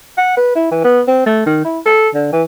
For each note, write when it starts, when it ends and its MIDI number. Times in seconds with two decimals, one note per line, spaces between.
0.18 0.34 78
0.37 0.53 71
0.56 0.69 64
0.71 0.80 52
0.84 1.02 59
1.08 1.24 60
1.26 1.44 57
1.46 1.62 51
1.65 1.79 64
1.86 2.09 69
2.14 2.32 50
2.33 2.43 52